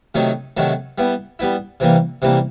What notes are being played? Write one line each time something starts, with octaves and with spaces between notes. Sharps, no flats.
C3 D#3 F#3 A3
C3 D#3 F#3 A3
G3 B3 E4
G3 B3 E4
C3 E3 G3 A#3
C3 E3 G3 A#3